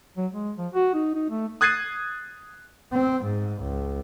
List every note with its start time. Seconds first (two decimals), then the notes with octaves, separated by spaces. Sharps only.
0.17 F#3
0.32 G#3
0.58 F3
0.74 F#4
0.94 D#4
1.15 D#4
1.30 A3
1.61 D#6 F#6 G#6 A6 C7 D#7
2.92 C4
3.24 G#2
3.61 C#2